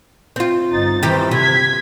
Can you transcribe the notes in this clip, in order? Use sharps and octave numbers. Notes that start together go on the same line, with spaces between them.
C4 F4
G1 D#4 A6
D#3 E3 G4 C5
C3 G#6 B6